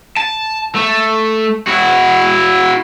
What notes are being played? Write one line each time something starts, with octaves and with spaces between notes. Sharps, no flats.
A5
A3
E4 F#4